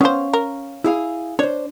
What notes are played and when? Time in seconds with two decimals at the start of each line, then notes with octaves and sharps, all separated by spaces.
0.01 B3 C#4 C5 F5
0.33 A#4
0.84 E4 G#4 F5
1.39 D4 C5 C#5